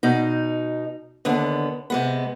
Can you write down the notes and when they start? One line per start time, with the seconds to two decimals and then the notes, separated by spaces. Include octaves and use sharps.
0.03 B2 D#4
1.25 D#2 D3 B3
1.90 C3 G#3 B3